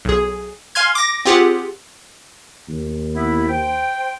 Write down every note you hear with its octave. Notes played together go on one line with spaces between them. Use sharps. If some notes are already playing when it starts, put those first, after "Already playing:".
B1 G#4
F5 G#5 C6 F6 G#6
D6 A#6
C4 F4 G4 G#4 F#5
D#2
B3 E4
C5 G5